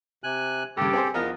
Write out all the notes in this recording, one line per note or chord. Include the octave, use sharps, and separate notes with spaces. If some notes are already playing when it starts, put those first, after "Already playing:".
C3 G#5 F#6
G2 C#3 G4 A4
C4 G#4 C5
E2 F3 B3 F4 A#4 D#5